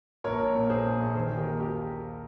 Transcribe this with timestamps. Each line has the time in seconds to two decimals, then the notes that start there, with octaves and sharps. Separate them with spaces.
0.24 A#1 A#4 C#5
0.40 A#1
0.55 A#2
0.70 A#1 G#4 C5
0.85 A#2
1.00 A#1
1.15 D#3 G#4 C5
1.30 D#3
1.37 G4 A#4
1.45 D#2
1.60 G4